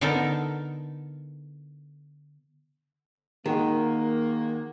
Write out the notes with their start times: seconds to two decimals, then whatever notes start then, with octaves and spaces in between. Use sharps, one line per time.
0.01 D3 B3 D#4 A4 A#4
3.46 D#3 G#3 A#3 F#4